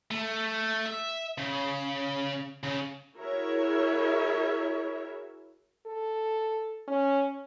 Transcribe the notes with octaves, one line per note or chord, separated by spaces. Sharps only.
A3
E5
C#3
C#3
E4 F#4 G#4 A#4 C#5 E5
A4
C#4